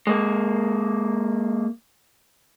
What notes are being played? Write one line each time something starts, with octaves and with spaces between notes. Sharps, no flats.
G#3 A#3